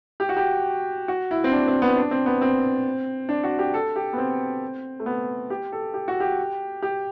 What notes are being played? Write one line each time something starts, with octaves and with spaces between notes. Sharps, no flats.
G4
F#4
G4
F#4
E4
C4
D4
C4
B3
D4
C4
B3
C4
D4
F#4
G4
A4
G4
B3
C4
A3
B3
G4
A4
G4
F#4
G4
G4